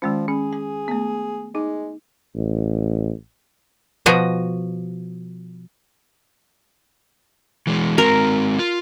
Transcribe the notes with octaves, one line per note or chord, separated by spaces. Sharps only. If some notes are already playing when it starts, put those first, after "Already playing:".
D#3 F3 G#3 C#4
C#4 G#4
G#5
A3 B3
G#3 D#4
A1
B2 F3 F#4 D#5
E3 G#3
G#3 C4 F#4 A#4
F4